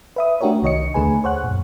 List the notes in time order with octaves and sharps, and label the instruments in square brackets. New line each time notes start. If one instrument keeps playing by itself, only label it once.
[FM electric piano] B4 E5 D#6
A3 D4 F#4 G4 A#4 C#5
C2 D#3 C#5 D#5 C#7
D#2 D3 A3 G#4 B4 G#5
C5 C#5 F#5 F#6
F#2 A#2